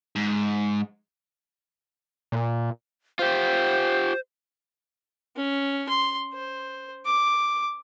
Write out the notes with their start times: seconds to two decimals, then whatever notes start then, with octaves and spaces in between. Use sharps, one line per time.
0.16 G#2
2.32 A#2
3.19 F4 G4 C5
5.36 C#4
5.88 C6
6.34 C5
7.05 D6